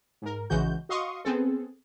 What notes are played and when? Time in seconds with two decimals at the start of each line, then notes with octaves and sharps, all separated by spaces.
0.22 G#2 A#4
0.50 A#1 C#3 E3 G#3 F#4 G6
0.89 F#4 D#5 F5 C6 C#6 D#6
1.25 B3 C4 G#4 A4